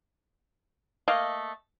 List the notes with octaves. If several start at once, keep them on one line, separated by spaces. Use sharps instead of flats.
A3 A#3 D#5 F5